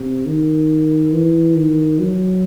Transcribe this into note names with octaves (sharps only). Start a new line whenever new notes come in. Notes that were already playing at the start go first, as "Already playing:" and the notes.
Already playing: C3
D#3
E3
D#3
F#3